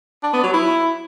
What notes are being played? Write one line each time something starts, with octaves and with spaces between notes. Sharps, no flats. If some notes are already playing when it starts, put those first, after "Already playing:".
D4
B3
F#3
E4